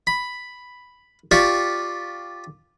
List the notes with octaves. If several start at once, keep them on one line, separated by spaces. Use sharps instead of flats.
B5
F4 G4 D5 G5 C#6